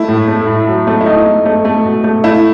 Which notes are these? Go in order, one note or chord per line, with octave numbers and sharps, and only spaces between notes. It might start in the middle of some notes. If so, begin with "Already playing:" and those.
Already playing: A3 E4
A2
A3
A2
F#3
A3
E4
A3 D#4
A3
A3
A3
B2
A3
A3 E4